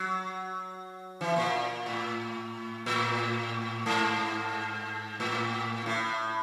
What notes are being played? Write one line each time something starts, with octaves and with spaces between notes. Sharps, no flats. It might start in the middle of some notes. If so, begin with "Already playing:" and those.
Already playing: F#3
E3
A#2
A2
A2
G#2
A2
A2